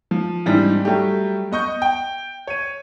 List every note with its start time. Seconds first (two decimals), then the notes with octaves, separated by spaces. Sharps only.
0.11 F3
0.46 G#2 E3 G3 C4 D4
0.85 F#3 G3 A3 G4
1.52 B3 D#5 C#6 G6
1.82 G5
2.47 C#5 D#7